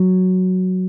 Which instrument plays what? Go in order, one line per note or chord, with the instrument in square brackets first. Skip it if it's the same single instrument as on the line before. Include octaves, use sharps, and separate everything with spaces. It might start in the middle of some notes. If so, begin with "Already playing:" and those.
Already playing: [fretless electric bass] F#3